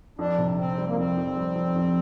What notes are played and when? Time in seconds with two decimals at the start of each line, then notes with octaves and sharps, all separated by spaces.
0.19 F2 D4
0.38 C3
0.58 C3 C4
0.78 G3
0.88 A#3
0.97 F2 C4
1.17 F2
1.36 G3
1.56 F2
1.76 F2